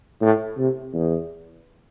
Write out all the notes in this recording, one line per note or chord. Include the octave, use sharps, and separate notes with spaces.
A2
C3
E2